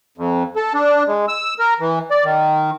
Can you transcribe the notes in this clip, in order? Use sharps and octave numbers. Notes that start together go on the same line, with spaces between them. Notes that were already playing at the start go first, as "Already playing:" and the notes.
F2
A4
D4
G#3
E6
A#4
E3
D5
D#3